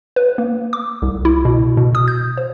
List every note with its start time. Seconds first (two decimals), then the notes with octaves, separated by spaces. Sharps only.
0.16 B4
0.38 A#3
0.73 D6
1.02 C2
1.25 E4
1.45 B2
1.77 B2
1.95 D#6
2.08 G6
2.37 C5